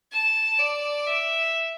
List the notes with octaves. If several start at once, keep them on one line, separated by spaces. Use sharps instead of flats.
A5
D5
E5